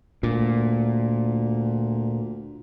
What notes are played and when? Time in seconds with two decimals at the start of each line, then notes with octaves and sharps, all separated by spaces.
0.23 D2 A#2